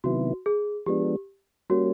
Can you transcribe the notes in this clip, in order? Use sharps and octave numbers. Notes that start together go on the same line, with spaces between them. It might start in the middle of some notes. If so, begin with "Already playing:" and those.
C3 D#3 F#3 B3 E4 F#4
G#4
F3 G#3 B3 D4 G4
G3 A#3 C#4 F#4